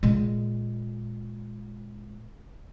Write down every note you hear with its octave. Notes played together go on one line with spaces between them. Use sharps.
A#2 G#3